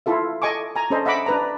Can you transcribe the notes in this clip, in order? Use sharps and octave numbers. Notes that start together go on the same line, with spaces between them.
E4 F4 A4 E5
A4 D#5 G#5 C#6 D6
G#5 A#5
C#4 D4 A4 C5 D#5
D#5 E5 F#5 B5 D6
D4 B4 A#5